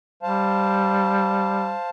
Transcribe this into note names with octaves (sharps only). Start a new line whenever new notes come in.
G3 C5 F5 A5